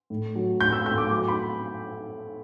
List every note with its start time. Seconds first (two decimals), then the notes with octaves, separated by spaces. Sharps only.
0.10 A2
0.36 F#3
0.61 A2 G6
0.73 E6
0.86 A2 G6
0.98 D6
1.11 F#3 D6
1.28 B5